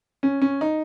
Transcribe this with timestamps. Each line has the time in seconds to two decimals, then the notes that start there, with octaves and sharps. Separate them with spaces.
0.23 C#4
0.42 C#4
0.61 D#4